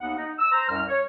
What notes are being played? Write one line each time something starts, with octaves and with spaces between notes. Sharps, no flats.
D#2 B3 D#4 F#5
D#4
E6
C5 A#5
C2 F#2 F6
C#5